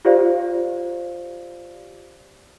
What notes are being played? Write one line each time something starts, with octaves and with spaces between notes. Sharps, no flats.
F4 G4 C5 D5 F5